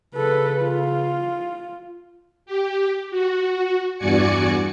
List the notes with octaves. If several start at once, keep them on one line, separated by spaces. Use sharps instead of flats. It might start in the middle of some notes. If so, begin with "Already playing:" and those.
C#3 A4 B4
F4
G4
F#4
E2 G2 F#4 D5 G#5 C#7